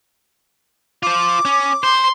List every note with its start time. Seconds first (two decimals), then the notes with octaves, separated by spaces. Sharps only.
1.03 F4 C5 D6
1.45 C#4
1.83 C5 C6